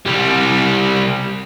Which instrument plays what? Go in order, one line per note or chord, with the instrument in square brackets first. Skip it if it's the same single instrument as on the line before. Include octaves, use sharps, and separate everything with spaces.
[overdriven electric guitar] C2 G3